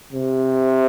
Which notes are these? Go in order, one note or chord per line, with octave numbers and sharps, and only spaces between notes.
C3